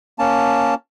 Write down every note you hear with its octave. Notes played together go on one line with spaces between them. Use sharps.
A#3 C#4 A5